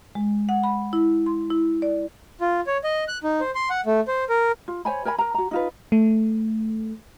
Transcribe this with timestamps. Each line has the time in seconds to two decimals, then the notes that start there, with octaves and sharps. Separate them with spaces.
0.15 G#3
0.49 F#5
0.64 B5
0.93 E4
1.26 C6
1.50 E4
1.82 D5
2.41 F4
2.67 C#5
2.84 D#5
3.08 F#6
3.24 D#4
3.40 C5
3.55 C6
3.70 F#5
3.86 A3
4.08 C5
4.29 A#4
4.68 F4
4.85 C5 C#5 G#5 B5
5.05 A#4 C#5 G#5 B5
5.18 A#4 A#5
5.34 F#4 A#5
5.51 D#4 F4 B4
5.92 A3